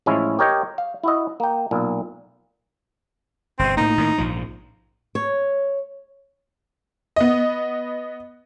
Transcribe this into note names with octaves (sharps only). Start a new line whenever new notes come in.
A1 F3 G#3 C#4 E4
G4 A#4 C#5 D#5 G5
F5
E4 F#4 D#5
A#3 G5
B1 A#2
G1 B2 C4
A2 A#3 D#4
A2 D#3 A#3
A#1 G#2 F3
C#5
B3 D#5